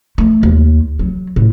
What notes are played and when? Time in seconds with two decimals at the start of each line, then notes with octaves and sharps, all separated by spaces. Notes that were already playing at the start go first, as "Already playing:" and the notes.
0.18 A3
0.43 D#2
0.99 F#3
1.36 A2